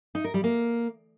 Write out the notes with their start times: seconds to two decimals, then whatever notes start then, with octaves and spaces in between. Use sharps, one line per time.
0.15 D#4
0.24 A#4
0.34 G3
0.44 A#3